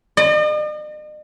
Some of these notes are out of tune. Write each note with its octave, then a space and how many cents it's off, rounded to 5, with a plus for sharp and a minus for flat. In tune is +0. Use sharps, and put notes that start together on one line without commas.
D#5 -45